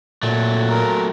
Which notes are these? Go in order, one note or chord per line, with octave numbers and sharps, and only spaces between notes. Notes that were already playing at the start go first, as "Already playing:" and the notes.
A#2 F#3 A3
A#4